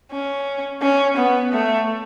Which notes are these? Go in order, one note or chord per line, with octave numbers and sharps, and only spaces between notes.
C#4
C#4
B3
A3